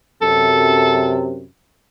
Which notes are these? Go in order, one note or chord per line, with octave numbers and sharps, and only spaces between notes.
F#2 C3 A4